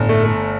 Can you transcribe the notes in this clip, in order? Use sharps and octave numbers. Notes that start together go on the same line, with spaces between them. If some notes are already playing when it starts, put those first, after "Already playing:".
Already playing: G1 A2
A3
A3